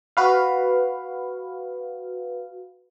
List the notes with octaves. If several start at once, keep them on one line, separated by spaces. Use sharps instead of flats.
F#4 B4 F5